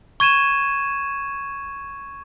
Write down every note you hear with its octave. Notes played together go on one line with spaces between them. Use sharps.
C#6 G#6 D#7 E7